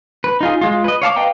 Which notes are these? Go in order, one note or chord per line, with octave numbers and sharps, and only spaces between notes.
B4
D#4 F4 G#4
G#3 F4
B4 D#5
C#5 F5 A5 D6
B4 D#5 F5 G5 A#5